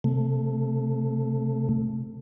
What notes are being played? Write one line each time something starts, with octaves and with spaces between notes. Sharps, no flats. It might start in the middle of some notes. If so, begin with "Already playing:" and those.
C3 A3